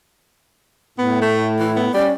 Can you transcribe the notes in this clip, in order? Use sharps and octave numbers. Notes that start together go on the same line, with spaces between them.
A2 B3
A3
E3 E4
B3
G3 C#4 D5